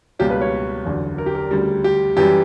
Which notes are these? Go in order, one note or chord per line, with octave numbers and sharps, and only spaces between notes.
C#2 B2 G3 A#3 C#4 G4
B4
C#5
F#1 E2 D3 F#3
A#4
G4
A#4
D2 C#3 G3
G4
F#2 E3 G3 G4